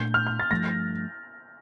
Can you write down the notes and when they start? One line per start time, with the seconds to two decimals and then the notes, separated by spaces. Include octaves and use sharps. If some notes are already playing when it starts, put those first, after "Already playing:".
Already playing: A#2 A3 D4 G6
0.14 F6
0.27 G6
0.40 A6
0.51 G2 F3 A3 A#6